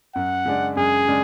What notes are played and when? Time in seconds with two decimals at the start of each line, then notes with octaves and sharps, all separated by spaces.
0.15 F#2 F#5
0.45 C#3 G#3 D4
0.76 F#2 G#4
1.08 C#3 G#3 D4